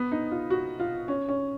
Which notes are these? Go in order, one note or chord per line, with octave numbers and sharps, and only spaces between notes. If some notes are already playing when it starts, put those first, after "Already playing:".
Already playing: B3
D#4
F4
F#4
F4
C#4
C#4